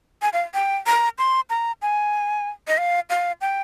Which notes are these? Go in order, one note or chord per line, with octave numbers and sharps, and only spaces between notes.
G#5
F5
G5
A#5
C6
A#5
G#5
D#5
F5
F5
G5